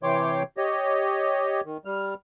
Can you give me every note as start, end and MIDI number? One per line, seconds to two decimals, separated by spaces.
0.03 0.43 48
0.03 0.43 52
0.03 0.43 73
0.03 0.43 79
0.03 0.43 84
0.03 0.43 86
0.57 1.61 67
0.57 1.61 73
0.57 1.61 75
1.65 1.77 51
1.85 2.14 55
1.85 2.14 89